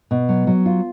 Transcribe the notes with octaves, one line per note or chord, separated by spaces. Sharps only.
B2
F#3
F#3
F4